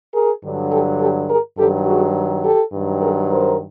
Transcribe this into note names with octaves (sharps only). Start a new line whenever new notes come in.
G#4 A#4
G2 D3 F#3
G4 A4
G4 A4
G#4 A#4
G2 D#3 F#3 G4 A4
F#4 G#4
G4 A4
G2 D#3 F#3
G#4 A#4
A#4 C5